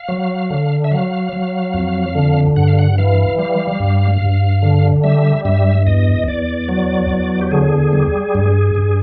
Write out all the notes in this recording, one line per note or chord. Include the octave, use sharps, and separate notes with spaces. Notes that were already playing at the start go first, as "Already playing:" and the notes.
Already playing: F5
F#3
D3
E5
F#3 F5
F#3
F2
D3
G2 F#5
F5
F#5
E3 F5
G3 F5
G2
G2
D3
G3 E5
G2 E5
E2 D#5
E2 D5
F#3
E2
G4
D3 G#4
G3
G2
G2